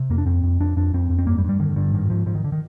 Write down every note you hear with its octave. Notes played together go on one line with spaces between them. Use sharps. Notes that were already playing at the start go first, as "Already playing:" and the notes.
Already playing: C3
F2 A#3
D4
F2 C4
F2
F2 D4
F2 D4
F2 C4
F2
C4
G2 A#3
G3
G2
G3
D3 D#3
G2 D3
G#2 D#3
G#2 F3
G#2 F3
D#3
D3
D#3